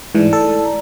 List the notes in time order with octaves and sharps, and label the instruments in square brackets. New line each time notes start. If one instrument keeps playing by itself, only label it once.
[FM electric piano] G#2 E3 [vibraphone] A3 E4 D5
[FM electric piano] A4
[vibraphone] D5 A#5